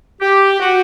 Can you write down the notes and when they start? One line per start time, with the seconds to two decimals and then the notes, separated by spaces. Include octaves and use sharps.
0.21 G4
0.60 F#4